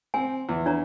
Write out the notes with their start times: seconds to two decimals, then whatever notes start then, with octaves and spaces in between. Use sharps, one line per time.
0.14 C4 G#5
0.49 E2
0.66 D4 C#5 A#5